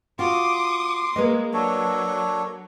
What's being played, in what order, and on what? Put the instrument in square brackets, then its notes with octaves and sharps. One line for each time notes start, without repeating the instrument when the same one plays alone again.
[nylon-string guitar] F4 F#4 [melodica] C6 [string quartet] D6 D#6
[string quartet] G#3 [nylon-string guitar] A#3 B4 D#5
[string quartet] F#3 [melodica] D4 A4 C#5